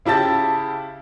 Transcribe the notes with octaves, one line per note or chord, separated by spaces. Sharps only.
C#3 E4 G4 A5 A6